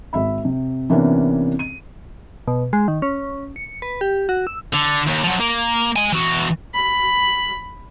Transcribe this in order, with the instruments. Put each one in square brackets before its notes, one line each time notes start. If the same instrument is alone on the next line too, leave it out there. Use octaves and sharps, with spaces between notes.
[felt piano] G#1 E5 B5
C3
C3 E3 A#3 B3 C#4 D4
D#7
[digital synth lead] B2
G#3
D#3
C#4
C#7
B4
G4
F#4
E6
[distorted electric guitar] D3
D#2
F3 F#3
A#3
G#3 G#5
E3 F#4
[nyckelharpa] B5